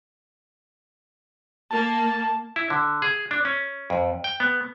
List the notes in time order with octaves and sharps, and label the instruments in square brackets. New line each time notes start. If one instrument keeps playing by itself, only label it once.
[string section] A#3 [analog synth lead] A5
[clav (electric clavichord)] E4
D3
G#4
D4
C#4
F2
G5
B3